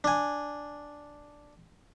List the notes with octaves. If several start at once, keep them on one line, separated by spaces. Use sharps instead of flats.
D4 G#5